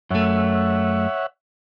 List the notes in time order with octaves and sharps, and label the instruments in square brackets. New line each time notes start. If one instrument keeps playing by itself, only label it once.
[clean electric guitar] F#2 A3 [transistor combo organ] C#5 E5 F#5